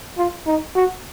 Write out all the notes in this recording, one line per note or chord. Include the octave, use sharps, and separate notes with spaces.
F4
D#4
F#4